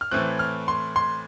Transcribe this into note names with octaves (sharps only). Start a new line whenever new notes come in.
F6
A2 E3 A3 C4 F#6
F6
C6
C6